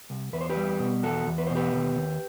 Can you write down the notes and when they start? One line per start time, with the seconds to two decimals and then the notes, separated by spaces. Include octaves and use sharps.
0.10 C2
0.33 E2 B4
0.41 C5
0.50 G4 B4
0.57 G3
0.79 B2
1.03 E2 F#4 A4
1.27 E2
1.38 B4
1.47 B2 C5
1.55 G4 B4
1.74 D#2
1.96 D#2